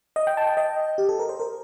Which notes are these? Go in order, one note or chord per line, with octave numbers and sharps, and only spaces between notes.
D#5
G5
A5
G5
D#5
G4
A4
A#4
C5
A#4